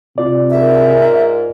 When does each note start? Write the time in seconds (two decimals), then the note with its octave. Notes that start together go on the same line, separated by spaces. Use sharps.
0.18 C3 F4 D5
0.50 G#2 A#4 E5